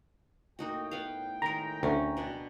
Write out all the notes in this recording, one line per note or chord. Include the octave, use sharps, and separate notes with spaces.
A2 A#3 D#4 F#4 G5
B3 F5
D#3 G#3 A#4 A#5
D2 C#4
B2 D4